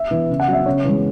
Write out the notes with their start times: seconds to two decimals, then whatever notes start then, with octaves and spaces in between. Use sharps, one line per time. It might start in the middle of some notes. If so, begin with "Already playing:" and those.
Already playing: E5
0.11 E3 B3
0.29 C#3
0.40 F#5
0.48 F#3 C#4 E5
0.66 C#3 C#5
0.84 E3 G#3